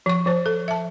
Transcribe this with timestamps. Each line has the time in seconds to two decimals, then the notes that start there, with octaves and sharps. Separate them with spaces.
0.06 F3 C#6
0.26 F3 C5
0.46 A4
0.68 E5 A5